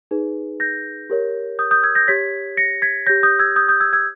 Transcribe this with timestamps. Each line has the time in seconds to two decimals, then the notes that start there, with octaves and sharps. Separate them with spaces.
0.11 D#4 G#4 B4
0.60 G6 A#6
1.10 G4 A#4 C#5
1.59 D#6 G6
1.71 D#6 G6
1.83 E6 G#6
1.95 G6 A#6
2.08 G4 C#5 G#6 B6
2.57 A#6 C#7
2.82 G#6 B6
3.06 G4 C#5 G6 A#6
3.23 D#6 G6
3.39 E6 G#6
3.56 D#6 G6
3.69 D#6 G6
3.80 E6 G#6
3.93 E6 G#6